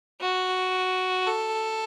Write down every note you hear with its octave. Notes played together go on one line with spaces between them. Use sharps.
F#4
A4